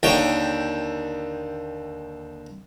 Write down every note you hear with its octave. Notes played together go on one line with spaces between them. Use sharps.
D#2 D3 C#5 G5